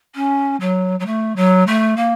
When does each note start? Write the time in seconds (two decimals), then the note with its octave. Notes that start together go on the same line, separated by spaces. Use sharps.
0.15 C#4
0.61 F#3
1.00 F#3
1.06 A3
1.36 F#3
1.67 A3
1.97 A#3